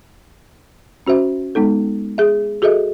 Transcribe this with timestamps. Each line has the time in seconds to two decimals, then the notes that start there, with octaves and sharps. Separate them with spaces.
1.07 C#4 F#4 C5 E5
1.55 G#3 B3 D#4 A4
2.18 G#4 E5
2.62 F#4 G#4 A4 D#5 E5